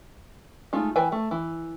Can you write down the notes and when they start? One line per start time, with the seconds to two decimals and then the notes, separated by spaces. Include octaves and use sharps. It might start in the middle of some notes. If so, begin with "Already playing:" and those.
0.73 G#3 A3 D#4 F4
0.96 E3 B4 E5 G5 G#5
1.12 A3
1.31 E3